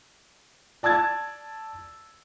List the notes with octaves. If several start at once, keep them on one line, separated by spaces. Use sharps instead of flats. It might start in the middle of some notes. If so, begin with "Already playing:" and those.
D5 A5 E6 G#6 A6